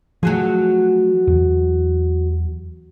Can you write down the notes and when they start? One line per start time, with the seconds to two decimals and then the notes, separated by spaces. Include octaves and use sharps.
0.23 F3 F#3 A3 F#4 G#4
1.27 E2